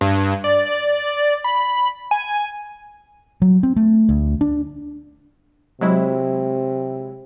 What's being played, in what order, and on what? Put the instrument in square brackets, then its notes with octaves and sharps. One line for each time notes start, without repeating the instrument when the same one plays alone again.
[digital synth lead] G2
D5
B5
G#5
[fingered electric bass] F#3
C4
A3
D2
D4
[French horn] C3 [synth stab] F#3 G#3 E4